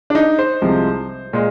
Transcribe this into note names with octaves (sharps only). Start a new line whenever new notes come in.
D4
D#4
C5
C2 C3 F3 G#3
A#2 G#3